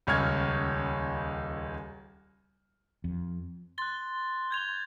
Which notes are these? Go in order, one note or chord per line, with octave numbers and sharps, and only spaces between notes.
D#1 C#2 C#5 F6 G#6
F2
C6 F#6 A6
G6 G#6 F7